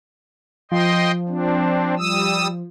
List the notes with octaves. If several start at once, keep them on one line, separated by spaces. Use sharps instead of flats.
F3 D#5 G5 C6
C4 D4
G3 D#6 E6